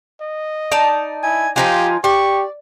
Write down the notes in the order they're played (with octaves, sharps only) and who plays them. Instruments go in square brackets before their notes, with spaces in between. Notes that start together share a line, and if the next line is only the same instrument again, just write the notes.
[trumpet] D#5
[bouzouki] D#4 D5 A5
[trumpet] E4 [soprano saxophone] G#5
[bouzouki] F3 D#4 F4 [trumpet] G4 [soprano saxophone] G#5
[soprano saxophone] G4 [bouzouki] D5 [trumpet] C#6